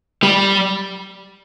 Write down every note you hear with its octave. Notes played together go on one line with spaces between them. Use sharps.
G3